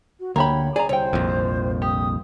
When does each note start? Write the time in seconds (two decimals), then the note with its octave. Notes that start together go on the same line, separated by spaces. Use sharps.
0.19 F#4
0.36 D2 A#3 G4 C#5 B5
0.76 G#4 D5 A#5
0.89 C2 C5 C#5 G5
1.13 A#1 F2
1.82 G4 D#6